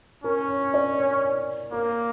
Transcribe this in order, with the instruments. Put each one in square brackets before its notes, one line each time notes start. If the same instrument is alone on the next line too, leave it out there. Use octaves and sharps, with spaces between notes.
[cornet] C#4 [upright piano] A#4
[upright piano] C#5
D5
C#5
[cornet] A#3 [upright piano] A#4